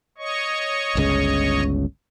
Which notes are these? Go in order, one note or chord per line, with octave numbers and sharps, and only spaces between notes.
C#5 D#5 C#6
G1 C#2 C#3